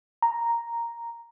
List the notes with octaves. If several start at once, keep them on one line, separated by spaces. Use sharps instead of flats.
A#5